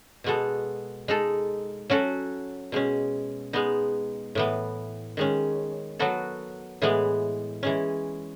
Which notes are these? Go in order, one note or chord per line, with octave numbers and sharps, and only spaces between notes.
B2 G#3 B3 F#4 A4
G#3 D#4 A4
F#3 C#4 F#4 A4
B2 G#3 C#4
G#3 B3 D#4
A2 E3 B3
D#3 G#3 C#4
F#3 B3 F#4 A4
A2 E3 G#3 B3
E3 G#3 C#4